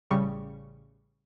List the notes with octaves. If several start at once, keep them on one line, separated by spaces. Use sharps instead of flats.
A1 C#3 G3 C#6